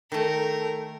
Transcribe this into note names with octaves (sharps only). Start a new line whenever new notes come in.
D#3 A3 A#4